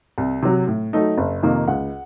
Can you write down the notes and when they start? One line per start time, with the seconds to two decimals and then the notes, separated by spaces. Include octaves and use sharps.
0.18 C2
0.42 C3 F#3
0.68 A2
0.93 F#3 A3 D#4
1.18 F#1
1.43 F2 C3 D#3 A#3
1.68 C#2 F#5